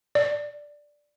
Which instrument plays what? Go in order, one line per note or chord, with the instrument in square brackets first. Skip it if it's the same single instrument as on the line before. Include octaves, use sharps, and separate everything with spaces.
[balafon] D5